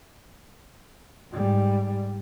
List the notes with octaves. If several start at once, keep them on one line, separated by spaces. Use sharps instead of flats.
G#2 G3